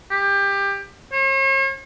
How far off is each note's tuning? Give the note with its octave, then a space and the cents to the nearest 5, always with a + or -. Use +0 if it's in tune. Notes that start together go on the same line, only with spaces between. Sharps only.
G4 +20
C#5 -45